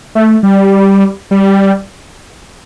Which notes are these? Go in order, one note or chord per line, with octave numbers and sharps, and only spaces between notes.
A3
G3
G3